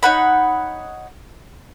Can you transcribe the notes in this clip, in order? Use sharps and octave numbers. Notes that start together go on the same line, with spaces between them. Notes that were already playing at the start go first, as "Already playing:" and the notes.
D#4 C#5 F#5 B5